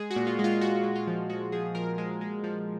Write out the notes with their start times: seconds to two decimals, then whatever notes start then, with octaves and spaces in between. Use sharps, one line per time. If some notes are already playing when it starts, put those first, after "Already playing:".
Already playing: G#3 G#4
0.10 F#4
0.16 A#2
0.27 F4
0.39 G#3
0.44 F4
0.61 A#2 F#4
0.84 G#3
0.96 F4
1.07 F3
1.30 G#3 F#4
1.52 F3 G#4
1.74 F3 A#4
1.98 G#3
2.21 G#3
2.44 F3